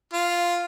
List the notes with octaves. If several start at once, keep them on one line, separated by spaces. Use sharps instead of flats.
F4